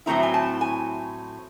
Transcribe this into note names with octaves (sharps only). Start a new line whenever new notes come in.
A2 F#3 A3 C4 E4 A#5
G#5
A5
G#5